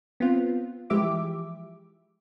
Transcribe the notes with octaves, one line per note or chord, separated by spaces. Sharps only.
B3 C4 F4
E3 F3 G#3 G4 E5 D6